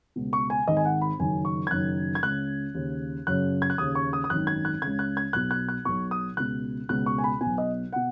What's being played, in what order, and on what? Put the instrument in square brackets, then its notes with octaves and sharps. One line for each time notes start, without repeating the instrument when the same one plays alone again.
[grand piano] C#2 B2
C#6
G#5
G#1 G#2 D#3 D#5
G#5
F#5
B5
F#1 F#2 D#3 G#5
C#6
G#6
F#1 F#2 D#3 F#6
G#6
C#2 C#3 F#6
D#2 C#3
F#1 F#2 C#3 F#6
G#6
F#6
D#2 C#3 D#6
C#6
D#6
D#6
G#1 F#2 D#3 F#6
G#6
F#6
C#2 C#3 G#6
F#6
G#6
B1 B2 F#6
F#6
F#6
B1 B2 C#6
D#6
C#2 B2 F#6
C#2 B2 F#6
C#6
G#5
B5
B2 G#5
B1
D#5
B2 F#5